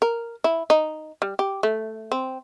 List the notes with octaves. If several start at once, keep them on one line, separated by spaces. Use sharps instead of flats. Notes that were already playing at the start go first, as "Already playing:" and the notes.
A#4
E4
D#4
G3
G4
A3
C4